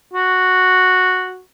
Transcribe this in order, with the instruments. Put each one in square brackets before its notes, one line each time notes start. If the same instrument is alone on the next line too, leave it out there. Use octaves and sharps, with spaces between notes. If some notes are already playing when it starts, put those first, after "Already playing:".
[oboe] F#4